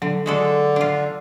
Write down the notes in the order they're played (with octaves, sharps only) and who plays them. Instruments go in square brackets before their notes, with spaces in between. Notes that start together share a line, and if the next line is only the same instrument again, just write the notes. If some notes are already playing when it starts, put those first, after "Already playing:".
[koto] D3 [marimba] F#3
[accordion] D3 [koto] G#3 F#4 A4
[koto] D4 F4